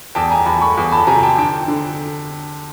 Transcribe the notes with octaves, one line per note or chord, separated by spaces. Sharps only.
E2 G5 A5
G#5 A#5
E2 A5 B5
B5 C#6
E2
A5 B5
C3 G#5 A#5
G5 A5
D3 G5 A5
D3